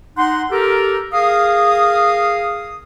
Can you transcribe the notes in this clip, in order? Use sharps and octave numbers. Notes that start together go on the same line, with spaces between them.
D#4 F#5 C6
G4 A4 A#4
G#4 A#4 F5 D#6